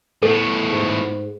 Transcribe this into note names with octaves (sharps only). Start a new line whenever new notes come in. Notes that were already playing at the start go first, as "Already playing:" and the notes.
A2 B3 A4
G#2